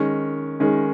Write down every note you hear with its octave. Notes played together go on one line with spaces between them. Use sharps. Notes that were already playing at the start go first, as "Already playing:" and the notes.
Already playing: D#3 G#3 C#4
D#3 G#3 C#4